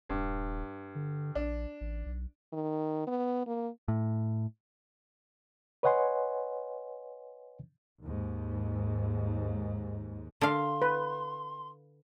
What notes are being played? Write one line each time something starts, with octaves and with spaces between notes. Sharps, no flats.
D#1 G2
D3
A#1 D4
A1
B1
D#3
B3
A#3
A2
B4 C#5 D#5 F#5 G#5 C6
D#2 G#2
D3 F5 C6
B4